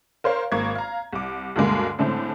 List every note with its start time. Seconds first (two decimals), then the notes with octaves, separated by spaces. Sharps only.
0.24 A#4 C5 C#5 F5
0.52 G#1 A#3 C#6 G#6
0.75 F5 A#5
1.13 C2 D6
1.56 D2 G2 B2 D3 G#3 A#3
1.99 A2 D3 G#3 A3 C4